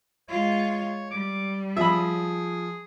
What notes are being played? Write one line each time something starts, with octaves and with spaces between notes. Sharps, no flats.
G#3 F4 C#5
G3 D6
F3 G#4 E5 B5